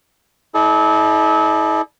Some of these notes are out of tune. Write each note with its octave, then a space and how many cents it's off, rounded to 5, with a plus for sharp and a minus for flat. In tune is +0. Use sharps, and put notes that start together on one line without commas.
E4 -35 A4 -35 D5 +30